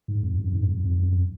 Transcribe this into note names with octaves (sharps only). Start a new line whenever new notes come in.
G#2
F2
F#2
G#2
F2
F2
F#2